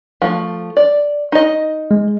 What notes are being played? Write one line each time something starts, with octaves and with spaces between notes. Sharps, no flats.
F3 A3
D5
D#4 D#5
G#3